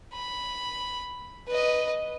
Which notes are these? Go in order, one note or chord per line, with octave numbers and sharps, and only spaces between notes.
B5
B4 D#5